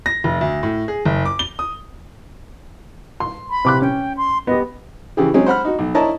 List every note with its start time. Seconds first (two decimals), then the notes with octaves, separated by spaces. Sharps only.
0.06 A#6
0.24 F1
0.41 D2
0.63 A2
0.88 G#4
1.05 F#1
1.25 D6
1.39 G7
1.59 D#6
3.20 C6
3.50 B5
3.65 C3 D6 F#6
3.82 C#4 G5
4.17 C6
4.47 B3 G4 D#5
5.17 C#3 E3 G4 G#4
5.34 F#3 G#3 C4 C#4 G#4
5.46 C5 F#5 B5 F6
5.64 D#4 F#4
5.79 B1
5.95 D4 E4 A#4 C#5 D#5 A5